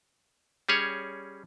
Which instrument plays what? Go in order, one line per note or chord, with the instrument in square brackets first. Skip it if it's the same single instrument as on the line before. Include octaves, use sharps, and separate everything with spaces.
[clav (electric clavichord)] G3 C#4 G#4 C#5